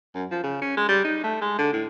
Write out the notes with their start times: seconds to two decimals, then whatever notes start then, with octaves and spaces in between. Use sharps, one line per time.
0.15 F#2
0.31 F3
0.43 C#3
0.62 C#4
0.77 G#3
0.88 G3
1.04 D#4
1.24 A3
1.41 G#3
1.58 D3
1.73 A2